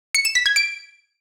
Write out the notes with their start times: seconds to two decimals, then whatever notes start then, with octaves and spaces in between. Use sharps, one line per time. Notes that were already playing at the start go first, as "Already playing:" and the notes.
0.15 C#7
0.25 E7
0.35 B6
0.46 G#6
0.56 D7